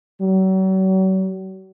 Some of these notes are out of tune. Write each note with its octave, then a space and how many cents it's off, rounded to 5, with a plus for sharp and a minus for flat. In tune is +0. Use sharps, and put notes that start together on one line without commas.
F#3 +40